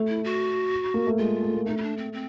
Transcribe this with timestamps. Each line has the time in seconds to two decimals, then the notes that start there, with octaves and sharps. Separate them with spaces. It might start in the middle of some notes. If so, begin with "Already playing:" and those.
Already playing: A3
0.08 E4
0.24 F#4
0.94 A#3
1.07 A3
1.18 G#3 F4
1.42 A3
1.54 A#3
1.66 A3 D#4
1.77 C#4
1.82 D4
1.97 C4
2.13 C4